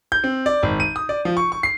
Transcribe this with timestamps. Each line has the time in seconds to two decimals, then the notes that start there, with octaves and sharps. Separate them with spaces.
0.12 G6
0.24 C4
0.46 D5
0.63 G#1
0.80 D#7
0.96 D#6
1.09 D5
1.25 F3
1.37 C#6
1.52 C#6
1.63 C7